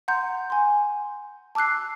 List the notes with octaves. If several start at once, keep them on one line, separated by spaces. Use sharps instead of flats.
F#5 A#5 C6 G6
G#5 C6
A5 D6 E6 F#6 C7